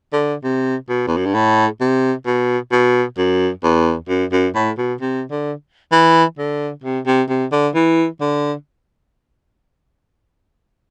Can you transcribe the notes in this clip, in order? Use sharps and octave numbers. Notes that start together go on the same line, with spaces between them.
D3
C3
B2
E2
F#2
G2
A2
C3
B2
B2
F#2
E2
F#2
F#2
A2
B2
C3
D3
E3
D3
C3
C3
C3
D3
E3
D3